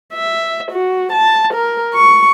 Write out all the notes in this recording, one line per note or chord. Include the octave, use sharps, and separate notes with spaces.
E5
F#4
A5
A#4
C#6